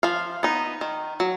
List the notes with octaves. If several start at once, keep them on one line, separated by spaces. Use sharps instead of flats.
F3 F5
B3 D#4
D#3
F#3